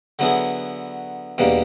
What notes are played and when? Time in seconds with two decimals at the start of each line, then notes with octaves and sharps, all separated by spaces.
0.19 D3 F#3 B3 E4 G#4
1.38 E2 B2 G3 A#3 D4